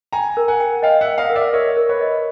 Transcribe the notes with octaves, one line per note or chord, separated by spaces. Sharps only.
G5 G#5 A#5
A#4
F#5 G#5
G5
D#5 F5 G5
E5 F#5
G5
D#5 F5
A#4
D5 E5
A#4 C#5 D#5
A#4
B4 C#5
D#5